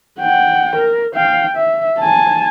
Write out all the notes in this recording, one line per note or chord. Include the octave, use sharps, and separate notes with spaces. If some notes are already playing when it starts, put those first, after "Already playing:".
F#5 G5
A#4
F5 G5
E5
G#5 A5